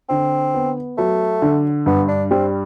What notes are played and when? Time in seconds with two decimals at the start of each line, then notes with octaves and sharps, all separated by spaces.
0.10 D3 C4
0.54 B3
0.98 F#3 A3
1.42 D3
1.86 G2 B3
2.08 D4
2.31 G3 C4